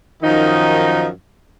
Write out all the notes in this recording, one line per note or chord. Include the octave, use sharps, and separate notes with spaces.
F#2 D#3 F3 D#4